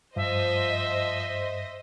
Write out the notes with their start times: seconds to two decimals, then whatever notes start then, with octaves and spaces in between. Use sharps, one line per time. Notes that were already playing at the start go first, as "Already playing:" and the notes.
0.16 G2 F3 C5 D#5 E5